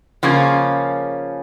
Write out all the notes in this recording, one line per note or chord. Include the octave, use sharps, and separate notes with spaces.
C#3 F3 A#3 C#4